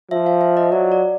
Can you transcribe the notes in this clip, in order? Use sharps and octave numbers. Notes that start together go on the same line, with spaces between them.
F3 E5
F5
E5
D#5
F#3 D5
D5